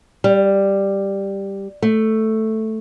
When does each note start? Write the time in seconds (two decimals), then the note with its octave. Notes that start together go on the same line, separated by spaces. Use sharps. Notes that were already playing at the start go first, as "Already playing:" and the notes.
0.24 G3
1.82 A3